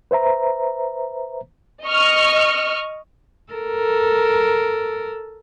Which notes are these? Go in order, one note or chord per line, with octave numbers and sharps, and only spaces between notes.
B4 C5 E5 A#5
D#5 C#6 F6
A4 A#4